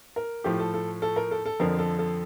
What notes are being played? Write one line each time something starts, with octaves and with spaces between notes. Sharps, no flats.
A#4
A2 F3 A3 G4
A4
A4
A4
A#4
A4
A4
F2 D3 F3 A#4
A4
A4